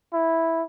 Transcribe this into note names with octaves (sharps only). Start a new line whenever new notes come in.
E4